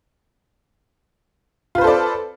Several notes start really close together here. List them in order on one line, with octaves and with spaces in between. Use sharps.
F4 B4 C5 A4 D5